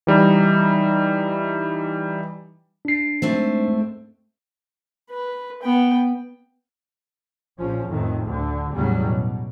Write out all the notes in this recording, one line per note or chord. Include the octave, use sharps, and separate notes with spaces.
E3 G3 D#4
D4 C7
G#2 A3 C4
B4
B3 G5
A#1 F3 C#4
F2 A2 D#3
D2 D3
E2 A2 C#3 F#3 G3 C#4
B2